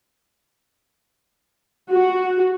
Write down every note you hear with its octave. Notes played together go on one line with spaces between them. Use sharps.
F#4